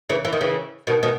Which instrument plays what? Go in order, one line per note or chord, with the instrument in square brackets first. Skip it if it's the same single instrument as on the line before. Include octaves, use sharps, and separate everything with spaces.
[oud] C#3 E3
E3
D#3
C#3 E3
B2 D#3
B2 D#3